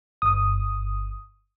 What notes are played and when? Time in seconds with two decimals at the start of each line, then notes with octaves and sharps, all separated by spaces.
0.22 G1 D#6